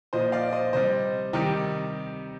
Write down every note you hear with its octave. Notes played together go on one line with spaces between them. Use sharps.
A#2 F3 C5 D#5
D5 F5
C5 D#5
C3 G3 C5 D#5
C3 D#3 G3 D#4 G4